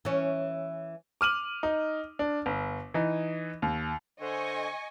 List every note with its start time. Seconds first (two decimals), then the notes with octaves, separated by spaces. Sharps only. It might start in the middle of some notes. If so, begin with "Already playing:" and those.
0.05 E3 C#4
1.21 D6 F6 D#7 F#7
1.63 D#4
2.19 D4
2.46 G1
2.94 E3 D#4
3.62 D#2
4.21 D3 C5 D#5 G#5 C#6